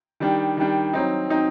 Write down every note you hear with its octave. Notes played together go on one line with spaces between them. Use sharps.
D#3 G3 D4
D#3 G3 D4
F#3 C4 D#4
F#3 C4 D#4